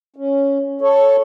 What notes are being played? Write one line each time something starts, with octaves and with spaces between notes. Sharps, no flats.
C#4
A4 C#5